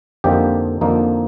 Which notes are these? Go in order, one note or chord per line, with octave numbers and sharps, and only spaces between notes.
F2 D3 F3 A#3 D#4 G4
F2 D3 F3 A#3 D#4